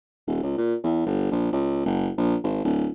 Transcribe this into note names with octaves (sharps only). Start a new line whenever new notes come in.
D#1
C#2
A#2
E2
G1
A#1
C#2
F#1
A#1
G#1
D1